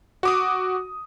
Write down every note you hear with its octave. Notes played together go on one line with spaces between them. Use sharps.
F#4 D6 D#6